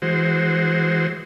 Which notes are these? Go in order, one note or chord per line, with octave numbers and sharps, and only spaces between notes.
E3 G#3 F#4 C5